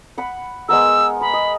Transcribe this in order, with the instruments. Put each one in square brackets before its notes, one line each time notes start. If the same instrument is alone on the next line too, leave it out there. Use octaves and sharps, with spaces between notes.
[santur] F#5 B5
[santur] G#3 B3 A#4 [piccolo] E6
[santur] A#5 [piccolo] B5
[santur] D#5